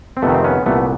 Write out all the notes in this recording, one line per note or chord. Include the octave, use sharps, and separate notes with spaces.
C4
F2 C3 D#3 A3 B3
C4
B3 C#4
C2 A#2 A3 B3